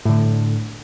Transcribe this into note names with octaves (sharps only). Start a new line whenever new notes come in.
A2 D3